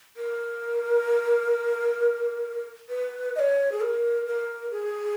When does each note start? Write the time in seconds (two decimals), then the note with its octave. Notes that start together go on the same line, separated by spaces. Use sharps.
0.17 A#4
2.89 B4
3.35 D#5
3.39 C#5
3.72 G#4
3.81 A#4
4.26 A#4
4.71 G#4